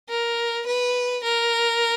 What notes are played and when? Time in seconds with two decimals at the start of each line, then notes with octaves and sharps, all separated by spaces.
0.09 A#4
0.66 B4
1.24 A#4